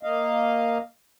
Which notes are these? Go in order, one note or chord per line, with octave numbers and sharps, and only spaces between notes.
A#3 D#5 F5